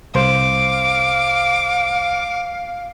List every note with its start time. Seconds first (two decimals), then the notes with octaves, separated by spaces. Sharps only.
0.15 C2 C5 F5 D6